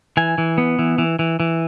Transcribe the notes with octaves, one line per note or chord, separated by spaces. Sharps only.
E3 G#5
E3
B3
E3
E3
E3
E3